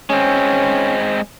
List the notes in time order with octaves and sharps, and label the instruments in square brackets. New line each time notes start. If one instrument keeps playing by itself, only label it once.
[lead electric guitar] G#3 C4 [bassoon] C#4